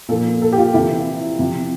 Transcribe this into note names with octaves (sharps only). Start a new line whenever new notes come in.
A#2 F3 A4
A4
G4
F4
C3 E3 E4
C3 F3